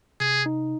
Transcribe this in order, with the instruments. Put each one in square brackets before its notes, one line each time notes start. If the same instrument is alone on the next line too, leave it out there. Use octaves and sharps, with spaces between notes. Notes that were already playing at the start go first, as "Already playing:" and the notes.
[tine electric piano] C3 [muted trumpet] G#4
[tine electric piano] D#4